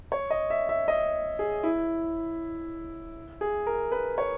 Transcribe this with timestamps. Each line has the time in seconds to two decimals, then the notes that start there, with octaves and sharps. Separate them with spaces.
0.12 C#5
0.31 D#5
0.50 E5
0.69 E5
0.88 D#5
1.39 G#4
1.63 E4
3.41 G#4
3.67 A#4
3.92 B4
4.18 C#5